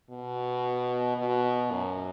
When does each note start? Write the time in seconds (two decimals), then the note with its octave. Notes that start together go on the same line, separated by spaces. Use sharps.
0.10 B2
1.17 B2
1.71 F#2